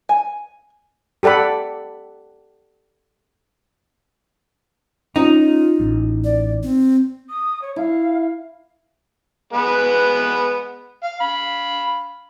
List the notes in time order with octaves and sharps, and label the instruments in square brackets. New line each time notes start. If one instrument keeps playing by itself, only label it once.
[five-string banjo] G#5
[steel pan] G4 A4 D5 F#5 B5
[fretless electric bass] C#4 [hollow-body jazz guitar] D#4 [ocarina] F4
[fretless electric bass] A1
[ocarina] D5
C4
[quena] D#6
C#5
[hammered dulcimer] E4 [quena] F5
[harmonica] G#3 B3 B4
F5
F5 B5